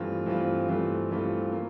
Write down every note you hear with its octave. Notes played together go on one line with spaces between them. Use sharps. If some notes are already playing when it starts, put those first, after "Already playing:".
Already playing: G2 E3 A3 C4 F4
G2 E3 A3 C4 F4
G2 E3 A3 C4 F4
G2 E3 A3 C4 F4
A#3